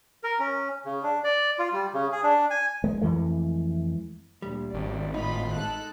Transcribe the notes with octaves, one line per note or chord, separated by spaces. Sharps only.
A#4
C#4
C#3
D4
D5
F4
G3
C#3
G#4
D4
G#5
G#3
F2 E3 G#3 A3
D2 A#2 G3
G#1 C#4 D5
A2 D#4 F4 B5
G#3 A4 F#6